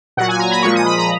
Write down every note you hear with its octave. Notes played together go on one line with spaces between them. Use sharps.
A#2 F#3 F#5
G#5
A#5
B5
A#2 F3 G#3 C#6
D#6
B5
A#5